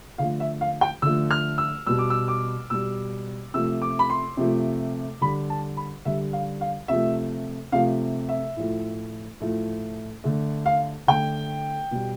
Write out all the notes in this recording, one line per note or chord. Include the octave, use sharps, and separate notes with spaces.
D3 F3 A3 F5
E5
F5
G5
D3 F3 A3 E6
F6
E6
B2 G3 E6
D6
E6
D6
B2 G3 E6
C3 F3 A3 E6
D6
B5
C6
C3 F3 A3
D3 G3 B5
A5
B5
D3 G3 E5
F5
F5
C3 F3 A3 E5
C3 F3 A3 F5
E5
A2 F3 A3
A2 F3 A3
D3 A3
F5
D3 A3 G5
B2 G3